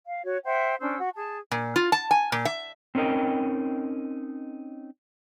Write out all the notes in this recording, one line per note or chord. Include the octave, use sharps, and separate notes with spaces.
F5
F#4 C#5
C5 E5 F#5 G5
C#4 D4 C5 E6
F#4
G#4 A5
A#2
F4
A5
G#5
A#2
E5
C4 C#4 D#4 A#4 D#5 G5